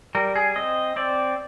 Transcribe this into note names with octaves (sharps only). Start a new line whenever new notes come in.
G3 A#4
G#4
C4 D#5
C4 D5